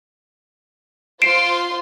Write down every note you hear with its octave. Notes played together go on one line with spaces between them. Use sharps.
F4 C5 C6 C7 D7 E7